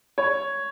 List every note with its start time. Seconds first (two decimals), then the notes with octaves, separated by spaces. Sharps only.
0.18 C#5